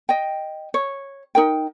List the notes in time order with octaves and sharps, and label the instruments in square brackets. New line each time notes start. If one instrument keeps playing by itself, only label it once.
[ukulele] D#5 G5
C#5
D#4 A#4 G5